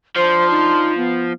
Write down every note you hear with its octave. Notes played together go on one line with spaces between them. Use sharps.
F3 D4 C5 C6
D#4
B3